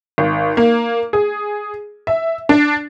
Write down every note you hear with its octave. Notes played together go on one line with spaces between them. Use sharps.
G#1
A#3
G#4
E5
D4